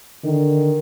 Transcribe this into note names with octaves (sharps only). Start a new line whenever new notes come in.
D3 D#3